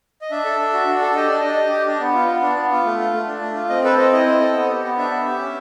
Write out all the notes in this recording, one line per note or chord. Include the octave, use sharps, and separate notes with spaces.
D#5
D4 E5
A4
D4
F#4
D4
A4
G4 D#5
D4 D5
D4 D#5
G4
G4
D4
B3
F4
B3
D4
B3
F4
A3
F4
A3
D4
A3
F4
C4 D#5
A4 B4
C4 D#5
E4 D#5
C4
A4
B3
G4
B3
D4 E5
B3
G4
C#4